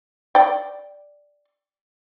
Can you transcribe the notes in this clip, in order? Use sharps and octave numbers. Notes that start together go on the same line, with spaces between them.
D5 G5